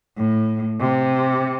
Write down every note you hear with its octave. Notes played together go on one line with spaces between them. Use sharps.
A2
C3